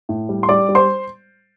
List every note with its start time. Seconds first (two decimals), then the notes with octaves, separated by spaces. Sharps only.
0.09 A2
0.29 G3
0.43 C6
0.49 G3 D5 D6
0.69 G3
0.75 C5 C6